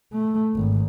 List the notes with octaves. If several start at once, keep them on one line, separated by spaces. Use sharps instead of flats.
A3
G#1